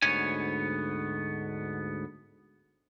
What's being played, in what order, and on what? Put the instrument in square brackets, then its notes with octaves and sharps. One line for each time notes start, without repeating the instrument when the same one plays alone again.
[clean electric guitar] D2 G#2 B3 C#5 G#5